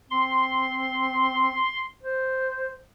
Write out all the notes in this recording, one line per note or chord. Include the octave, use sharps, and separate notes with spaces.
C4 C6
C5